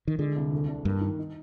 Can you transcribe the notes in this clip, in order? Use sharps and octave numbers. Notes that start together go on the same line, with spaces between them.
D#3
D3 G#3
C2
D2
D4
G2 A#3
D#3
D#4